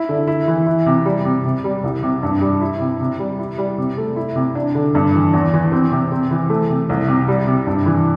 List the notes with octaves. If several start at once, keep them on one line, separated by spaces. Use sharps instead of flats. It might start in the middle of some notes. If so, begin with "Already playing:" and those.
Already playing: E4
D3
E4
E3
E4
C3
G3
C3
C3
G3
C2
C3
G2
G3
E4
C3
C3
G3
E4
G3
C3
A3
E4
C3
D4
D3
G2
E3
E2
E3
C4
C3
C4
E3
A3
C3
C2
C3
G3
C3
G2
E3